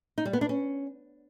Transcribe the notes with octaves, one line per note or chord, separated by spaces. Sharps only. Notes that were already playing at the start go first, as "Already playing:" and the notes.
D#4
G3
B3
D4
C#4